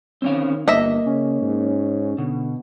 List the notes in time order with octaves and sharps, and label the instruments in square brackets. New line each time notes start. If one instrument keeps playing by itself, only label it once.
[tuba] D#3 [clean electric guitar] C4 C#4 F5
[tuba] G1 [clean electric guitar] A#3 [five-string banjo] D#5 E5
[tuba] C#3 [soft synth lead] C#4
[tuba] G#2
[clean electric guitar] B2 [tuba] D3